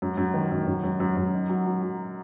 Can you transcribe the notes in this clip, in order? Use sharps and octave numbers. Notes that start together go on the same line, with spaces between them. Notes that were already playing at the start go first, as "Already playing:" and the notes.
F#2
F#2
D#3
F#2
F#2
F#2
F#2
F#2
D#4
F#3
F#3
F#3